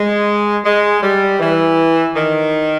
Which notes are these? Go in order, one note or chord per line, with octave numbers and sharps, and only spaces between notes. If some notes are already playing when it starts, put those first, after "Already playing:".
Already playing: G#3
G#3
G3
E3
D#3